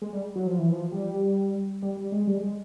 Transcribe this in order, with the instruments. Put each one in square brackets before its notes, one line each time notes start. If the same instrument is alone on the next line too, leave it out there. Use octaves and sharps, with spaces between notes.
[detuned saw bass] G#3
G3
F#3
F3
E3
F3
G3
G3
G3
G#3
G3
G#3